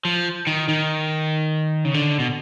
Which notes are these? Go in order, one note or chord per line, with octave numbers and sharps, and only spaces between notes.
F3
D#3
D#3
C#3
D3
B2